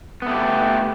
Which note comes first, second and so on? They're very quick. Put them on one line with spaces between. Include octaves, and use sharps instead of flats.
B3 A3 G4